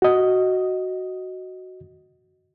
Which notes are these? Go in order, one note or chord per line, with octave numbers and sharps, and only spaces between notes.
F#4 D#5